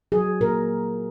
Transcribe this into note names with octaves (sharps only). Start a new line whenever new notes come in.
F#3 G#4
A#2 A#4